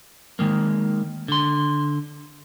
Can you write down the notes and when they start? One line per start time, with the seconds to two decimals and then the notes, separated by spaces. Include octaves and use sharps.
0.39 D#3 G#3 A#3
1.28 D3 C6